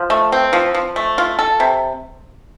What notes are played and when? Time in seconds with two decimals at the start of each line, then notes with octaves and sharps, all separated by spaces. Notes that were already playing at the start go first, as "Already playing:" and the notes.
Already playing: F3
0.10 A3
0.32 C4
0.53 F3
0.74 F3
0.96 A3
1.18 F4
1.39 A4
1.60 C3